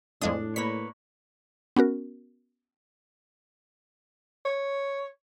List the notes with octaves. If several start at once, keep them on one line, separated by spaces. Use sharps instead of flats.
F2 A2 G#3 D4 D#6
A#3 B4 C#5 B6
B3 C#4 F#4 A#4
C#5